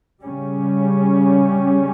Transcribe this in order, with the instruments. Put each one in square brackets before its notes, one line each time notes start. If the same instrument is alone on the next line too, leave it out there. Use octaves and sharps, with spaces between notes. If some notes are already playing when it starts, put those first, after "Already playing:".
[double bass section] C#3 G3 C#4